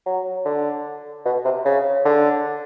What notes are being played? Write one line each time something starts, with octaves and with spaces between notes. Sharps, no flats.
F#3
D3
B2
C3
C#3
D3